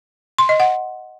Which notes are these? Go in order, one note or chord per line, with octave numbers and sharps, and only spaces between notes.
C6
D#5
F#5